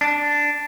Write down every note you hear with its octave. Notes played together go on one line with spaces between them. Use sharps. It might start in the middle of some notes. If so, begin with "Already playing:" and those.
D4